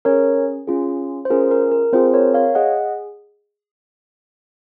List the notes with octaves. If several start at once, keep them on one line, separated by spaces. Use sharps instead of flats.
C#4 G#4 A#4 C#5
C#4 F4 G#4
C5
C#4 F4 G#4 A#4
A#4
A#4
C4 F4 G#4 C5
A#4 C#5
C#5 F5
G#4 D#5 F#5